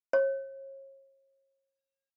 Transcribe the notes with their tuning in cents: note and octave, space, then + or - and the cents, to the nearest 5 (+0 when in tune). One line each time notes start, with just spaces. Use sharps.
C#5 -35